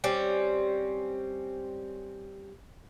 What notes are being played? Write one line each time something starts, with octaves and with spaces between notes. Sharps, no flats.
G3 C4 C#4